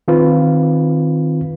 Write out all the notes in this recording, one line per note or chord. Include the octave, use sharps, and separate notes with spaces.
D#3 C4 F4 B4